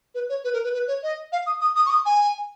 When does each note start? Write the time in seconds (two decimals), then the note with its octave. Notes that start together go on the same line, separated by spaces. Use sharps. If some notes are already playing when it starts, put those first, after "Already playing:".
0.15 B4
0.29 C#5
0.44 B4
0.53 A#4
0.64 B4
0.74 B4
0.88 C#5
1.03 D#5
1.32 F5
1.47 D#6
1.61 D#6
1.76 D#6
1.86 C#6
1.90 D#6
2.06 G#5